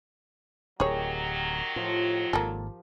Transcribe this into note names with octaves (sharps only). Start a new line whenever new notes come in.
D1 D#3 F#3 G4 G#4 A#4 C#5
A2 F3
G#1 G#2 A#3 A4